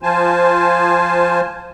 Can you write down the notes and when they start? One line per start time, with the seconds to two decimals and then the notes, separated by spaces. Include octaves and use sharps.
0.03 F3 F4 C5 G#5 A5